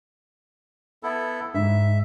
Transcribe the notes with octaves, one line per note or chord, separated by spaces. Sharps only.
B3 E4 A4
G#2 E5